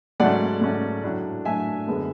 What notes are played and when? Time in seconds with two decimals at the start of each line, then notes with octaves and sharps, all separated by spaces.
0.20 G#2 F#3 A3 C#4 D5 F#5
0.61 G#2 F#3 A3 C#4
1.04 A2 F#3 A3 D4
1.45 A2 F#3 A3 D4 E5 G#5
1.87 F#2 D3 G#3 B3